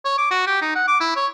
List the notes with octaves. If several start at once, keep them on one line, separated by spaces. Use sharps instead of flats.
C#5
D6
F#4
G4
D#4
F#5
D6
E4
C#5